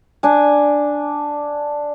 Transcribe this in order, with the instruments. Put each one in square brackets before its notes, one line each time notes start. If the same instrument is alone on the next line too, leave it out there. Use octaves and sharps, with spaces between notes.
[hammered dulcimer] D4 G#5